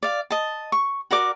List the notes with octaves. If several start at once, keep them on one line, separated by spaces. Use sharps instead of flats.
D5 F5
D#5 A5
C#6
F#4 A#4 D5 D6